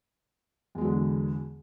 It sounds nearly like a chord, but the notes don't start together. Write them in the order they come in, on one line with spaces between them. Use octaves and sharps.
E2 G#3 F#3 D3